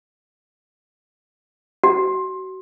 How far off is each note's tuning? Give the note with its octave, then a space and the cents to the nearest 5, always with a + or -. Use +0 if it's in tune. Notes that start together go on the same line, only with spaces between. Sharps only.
F#4 +30